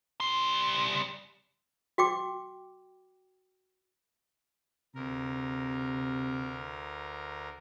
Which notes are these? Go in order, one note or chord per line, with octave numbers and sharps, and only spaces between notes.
G3 C6
F#4 G5 D6
D2 C3 A#4